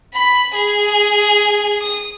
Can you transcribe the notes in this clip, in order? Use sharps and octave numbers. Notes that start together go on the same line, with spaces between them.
B5
G#4
D#6